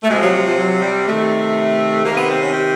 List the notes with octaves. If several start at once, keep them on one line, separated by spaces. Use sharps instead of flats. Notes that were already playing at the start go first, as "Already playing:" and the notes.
A3
C3 F3 G#3
F#3
F#3
F3
F#3
G3
C3 D#3 A3
C3 D#3 A#3
B3
C4
C#4
G4